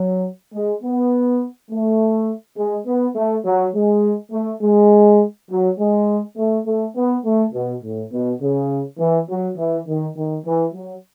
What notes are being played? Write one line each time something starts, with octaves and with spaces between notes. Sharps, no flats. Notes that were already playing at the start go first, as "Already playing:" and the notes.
Already playing: F#3
G#3
B3
A3
G#3
B3
A3
F#3
G#3
A3
G#3
F#3
G#3
A3
A3
B3
A3
B2
A2
B2
C#3
E3
F#3
E3
D#3
D#3
E3
F#3